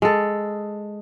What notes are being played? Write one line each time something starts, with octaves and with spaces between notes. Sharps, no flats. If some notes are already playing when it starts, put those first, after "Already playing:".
G#3 A4